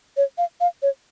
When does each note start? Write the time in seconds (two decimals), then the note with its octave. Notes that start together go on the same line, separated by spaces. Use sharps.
0.17 C#5
0.38 F5
0.61 F5
0.82 C#5